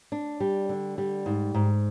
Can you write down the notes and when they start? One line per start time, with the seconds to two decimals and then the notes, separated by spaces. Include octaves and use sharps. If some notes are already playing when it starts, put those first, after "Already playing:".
0.12 D4
0.40 G3
0.69 D3
0.98 G3
1.26 G#2
1.54 G#2